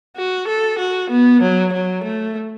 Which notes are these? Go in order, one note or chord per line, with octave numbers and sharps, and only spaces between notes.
F#4
A4
F#4
B3
F#3
F#3
A3